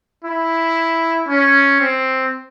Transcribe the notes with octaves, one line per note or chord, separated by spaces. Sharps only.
E4
C#4
C4